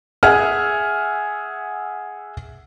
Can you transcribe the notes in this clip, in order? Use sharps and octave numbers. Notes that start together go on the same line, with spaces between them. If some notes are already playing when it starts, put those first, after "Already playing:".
G#4 E5 F#5 G#5 F6